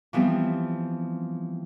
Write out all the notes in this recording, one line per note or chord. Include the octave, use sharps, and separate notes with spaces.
E3 F3 G3 B3 C4